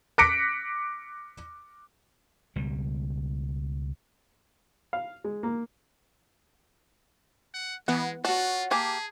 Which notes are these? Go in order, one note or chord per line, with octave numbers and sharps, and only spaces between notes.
D6 F#6 A#6 B6 C#7 D7
C#2 B2 G3
F5
G#3
A#3
F#5
E3 G#3 B3 F#5
F4 F#4 C#5 F#5 A5
A#3 G4 G#4 G#5 A5